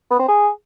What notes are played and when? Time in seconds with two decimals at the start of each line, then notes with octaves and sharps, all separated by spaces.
0.11 B3
0.19 C4
0.28 G#4